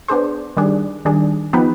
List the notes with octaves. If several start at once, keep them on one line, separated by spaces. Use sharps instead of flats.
B3 D4 G#4 C5
D#3 G3 D4 G#4
D#3 G3 D4 G#4
F3 B3 D#4 G4 B4